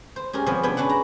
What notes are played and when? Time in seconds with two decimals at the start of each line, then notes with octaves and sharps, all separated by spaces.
0.16 C5
0.33 C#4 G4 G#4 A#4
0.46 C3 F3 G3 B3 F#4 G#4
0.63 B3 D4 G#4 C#5 G5
0.77 C#4 D4 B4 F#5
0.89 A#5